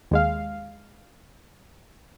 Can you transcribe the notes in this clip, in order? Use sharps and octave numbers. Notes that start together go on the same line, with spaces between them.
D#2 G#3 F5